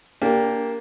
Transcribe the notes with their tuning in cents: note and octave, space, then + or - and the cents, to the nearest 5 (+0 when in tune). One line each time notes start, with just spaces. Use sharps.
A#3 +0 D4 -20 G4 +20